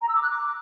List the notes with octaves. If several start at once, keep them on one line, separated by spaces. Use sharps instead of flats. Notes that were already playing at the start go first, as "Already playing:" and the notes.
A#5
E6
D6
F#6
D6